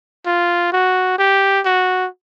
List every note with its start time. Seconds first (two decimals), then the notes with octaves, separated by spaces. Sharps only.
0.26 F4
0.73 F#4
1.19 G4
1.65 F#4